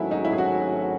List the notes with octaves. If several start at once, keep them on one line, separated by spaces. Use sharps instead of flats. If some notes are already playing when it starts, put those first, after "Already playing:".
Already playing: G#1 G#2 F#3 A3 C#4 E4
D#4
E4
G#4
F#4